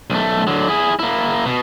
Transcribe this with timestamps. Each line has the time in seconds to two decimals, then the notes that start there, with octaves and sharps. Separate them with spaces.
0.10 B1 A3
0.47 D3 F#3
0.68 E4 G#4
0.99 A#3 E4
1.46 B2